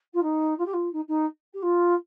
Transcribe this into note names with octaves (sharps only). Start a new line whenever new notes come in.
F4
D#4
F4
G4
F4
D#4
D#4
G4
F4